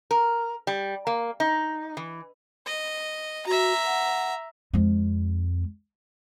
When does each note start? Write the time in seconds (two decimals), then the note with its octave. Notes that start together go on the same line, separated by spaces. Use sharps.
0.11 A#4
0.67 G3
1.07 A#3
1.40 D#4
1.97 E3
2.66 D#5
3.47 F#4 E5 A#5
3.86 F#5
4.74 F2 G#3